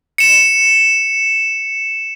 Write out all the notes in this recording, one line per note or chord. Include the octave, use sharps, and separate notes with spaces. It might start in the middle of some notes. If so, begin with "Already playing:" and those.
C#7 E7